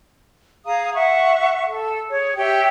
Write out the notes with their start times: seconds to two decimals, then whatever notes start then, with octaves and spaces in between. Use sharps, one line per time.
0.65 G#4 F5 A#5 D#6
0.94 E5 F#5 C#6
1.66 A4
2.09 G#4 C#5
2.37 G4 C#5 E5 G5